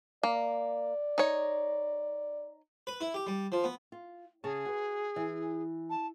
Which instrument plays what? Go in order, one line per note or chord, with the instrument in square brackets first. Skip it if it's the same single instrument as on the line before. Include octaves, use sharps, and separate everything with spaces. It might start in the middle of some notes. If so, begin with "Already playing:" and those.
[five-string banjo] A#3 [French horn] D5
[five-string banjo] D#4 C#5
[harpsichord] B4
E4
G4
G3
F3
B3
[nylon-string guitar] F4
[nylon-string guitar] C#3 C#5 A5 [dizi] G#4
[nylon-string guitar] F#4 B4
E3
[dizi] A5